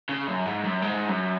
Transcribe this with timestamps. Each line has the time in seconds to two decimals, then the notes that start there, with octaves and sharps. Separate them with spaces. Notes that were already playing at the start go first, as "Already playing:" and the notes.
0.09 C#3
0.27 F#2
0.46 G#2
0.64 F#2
0.82 G#2
1.09 F#2